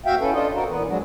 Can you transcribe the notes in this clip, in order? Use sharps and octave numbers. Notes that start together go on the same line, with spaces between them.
D#2 F#4 E5 F5 G5
E3 C#4 A4 B4
D4 F4 A4 D#5
C4 F#4 A#4
A#2 E3 B3 B4
F3 F#3 G#3 D4 F#4